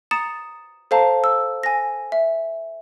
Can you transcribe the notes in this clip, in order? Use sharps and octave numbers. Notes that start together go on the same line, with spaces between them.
A#5 D#6 A6 C#7 E7
A4 C5 F5 A5 A#5
E6
G#5 A#6
E5